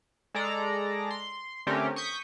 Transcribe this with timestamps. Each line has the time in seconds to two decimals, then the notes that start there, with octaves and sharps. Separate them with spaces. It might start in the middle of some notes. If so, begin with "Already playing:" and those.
0.34 G#3 A4 D5 A#5
1.11 C6
1.67 D3 A3 C4 C#4 G4 A#4
1.96 C#6 D#6 G6 B6